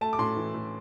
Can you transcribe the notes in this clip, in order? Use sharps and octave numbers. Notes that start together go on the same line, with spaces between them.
A3 A5
D6
A2 C6
E3
A2